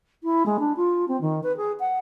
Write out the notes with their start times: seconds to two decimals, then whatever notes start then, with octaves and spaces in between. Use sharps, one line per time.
0.23 E4
0.46 G#3
0.59 D4
0.76 F4
1.08 C4
1.21 D#3
1.43 B4
1.57 G#4
1.80 F#5